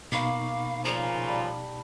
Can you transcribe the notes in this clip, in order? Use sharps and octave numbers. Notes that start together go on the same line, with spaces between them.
B2 A#3 D#4 F5 B5 C#6
A#2 C#3 F3 A#5
G3 A5 B5